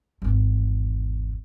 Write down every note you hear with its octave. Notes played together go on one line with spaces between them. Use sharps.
G#1 E2